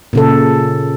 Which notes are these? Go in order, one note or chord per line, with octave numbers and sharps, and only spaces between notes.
A#2 C#3 A4